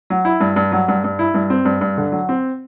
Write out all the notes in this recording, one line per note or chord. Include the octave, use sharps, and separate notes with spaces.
F#3
E4
G2
G2
F#3
G2
G2
E4
G2
C4
G2
G2
D3
F#3
C4